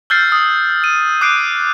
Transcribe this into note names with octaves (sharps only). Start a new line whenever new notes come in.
E6 F6 G6 A6 C7
D#6
D#7
D6 F#6 C7 D7